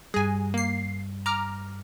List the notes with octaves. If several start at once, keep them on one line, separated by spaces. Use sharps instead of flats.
G2 G3 G#4 G#5
A#3 C7
A#5 D6 F6